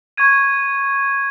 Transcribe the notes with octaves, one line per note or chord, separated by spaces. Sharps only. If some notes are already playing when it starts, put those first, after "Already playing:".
C#6 G#6 D#7